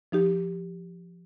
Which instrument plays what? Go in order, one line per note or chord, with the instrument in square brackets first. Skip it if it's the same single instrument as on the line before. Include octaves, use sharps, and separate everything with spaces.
[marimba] F3 D#4 G4